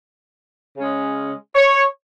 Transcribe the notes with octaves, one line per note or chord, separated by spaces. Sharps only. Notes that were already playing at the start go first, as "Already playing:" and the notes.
C#3 G#3 C#4
C#5